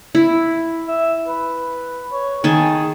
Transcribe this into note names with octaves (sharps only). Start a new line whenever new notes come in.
E4
E5
B4
C#5
D#3 G#4 G#5 A5